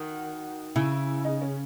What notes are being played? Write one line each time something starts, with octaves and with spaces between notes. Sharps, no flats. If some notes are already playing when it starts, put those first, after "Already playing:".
Already playing: D#3 F#4
C#3 E4
D#4
C#4